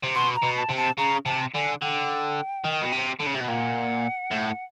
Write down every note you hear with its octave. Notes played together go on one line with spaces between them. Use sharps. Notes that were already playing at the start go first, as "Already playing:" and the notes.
C3
B2 C6
A#5
B2
A5
C3
A5
C#3 A#5
C3 A5
D3 G#5
D3 G5
D#3
B2
C3
D3
C#3
C3
B2
A#2 F#5 G5
A2